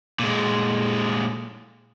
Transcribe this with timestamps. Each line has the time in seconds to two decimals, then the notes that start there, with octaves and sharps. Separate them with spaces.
0.19 A#2 G#3